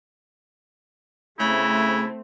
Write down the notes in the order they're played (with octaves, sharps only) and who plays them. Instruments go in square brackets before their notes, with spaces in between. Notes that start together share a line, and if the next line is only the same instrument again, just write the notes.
[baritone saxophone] C#3 [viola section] A3 C4 [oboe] E4